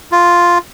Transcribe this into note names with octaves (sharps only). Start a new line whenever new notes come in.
F4